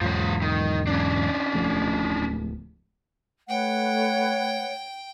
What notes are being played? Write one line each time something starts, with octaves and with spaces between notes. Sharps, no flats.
E2 G#2 F3 C#5
D#3
C#4 D4
D1 F3 A3
A3 B4 C#5 F#5 G5